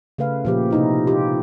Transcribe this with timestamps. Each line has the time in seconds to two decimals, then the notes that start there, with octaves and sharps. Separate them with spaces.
0.18 C#3 A3 B4 F5
0.45 A#2 F3 G4
0.71 C3 D#4 E4
1.07 F4 G4